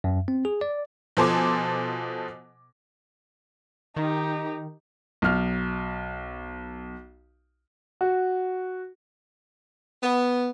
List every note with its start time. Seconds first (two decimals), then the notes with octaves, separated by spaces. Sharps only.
0.04 F#2
0.28 C4
0.45 G#4
0.61 D5
1.17 B2 F3 A4 C5 G#5 D6
3.96 D#3 D#4 G4
5.22 B1 F6
8.01 F#4
10.03 B3